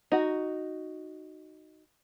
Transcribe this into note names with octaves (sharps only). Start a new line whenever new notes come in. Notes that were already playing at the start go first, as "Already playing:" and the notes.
D#4 F#4